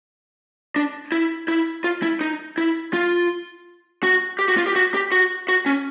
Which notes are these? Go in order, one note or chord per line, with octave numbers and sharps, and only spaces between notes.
D4
E4
E4
F4
E4
D#4
E4
F4
F#4
G4
F#4
F4
G4
F#4
G4
F#4
F#4
C#4